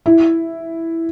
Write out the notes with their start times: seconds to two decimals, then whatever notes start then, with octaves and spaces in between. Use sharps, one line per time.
0.06 E4